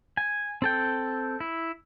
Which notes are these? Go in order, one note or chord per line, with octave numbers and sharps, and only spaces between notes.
G#5
C4 A4 G5
E4